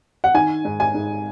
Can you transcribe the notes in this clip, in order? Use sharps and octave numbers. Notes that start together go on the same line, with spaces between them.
F#5
D#3 G#5
G#2
G#5
G#2